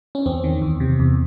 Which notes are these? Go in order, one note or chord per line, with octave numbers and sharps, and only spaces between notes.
C#4
E2 C4
D#3
E2
C3
E2